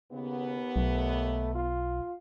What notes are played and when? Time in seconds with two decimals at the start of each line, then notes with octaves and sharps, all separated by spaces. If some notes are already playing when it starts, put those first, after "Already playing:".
0.12 D#2 C#3 B3
0.76 B1 A3
1.55 F4